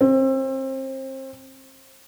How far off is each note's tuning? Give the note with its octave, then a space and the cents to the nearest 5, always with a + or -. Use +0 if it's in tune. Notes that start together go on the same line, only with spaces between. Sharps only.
C4 +30